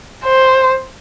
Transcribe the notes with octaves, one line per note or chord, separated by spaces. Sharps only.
C5